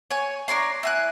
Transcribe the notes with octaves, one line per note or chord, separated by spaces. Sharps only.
C#5 G#5
D4 A#4 C#5 C6
E4 G#5 F#6